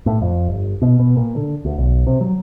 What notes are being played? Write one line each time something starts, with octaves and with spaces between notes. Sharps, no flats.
A2
F2
G1
B2
B2
A#2
D3
D2
B1
C3
F#3